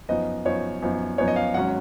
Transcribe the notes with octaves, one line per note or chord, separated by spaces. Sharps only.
F#2 F3 B3 D#4 D#5
F#2 F3 B3 D#4 C#5
F#2 F3 B3 D#4
F#2 F3 B3 D#4 C#5
D#5
F5
G#1 F#3 C#4 F#5